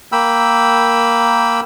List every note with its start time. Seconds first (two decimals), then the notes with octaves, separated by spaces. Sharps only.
0.12 A#3 G5 B5 E6